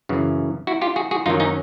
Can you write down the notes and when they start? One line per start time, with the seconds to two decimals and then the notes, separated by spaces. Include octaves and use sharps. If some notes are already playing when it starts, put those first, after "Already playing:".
0.09 F#2 C#3 E3
0.67 E4 F#4
0.82 F4 G4
0.96 F#4 G#4
1.11 F#4 G#4
1.26 F#2 D#3 F#3 D#4 F4
1.40 C#4 D#4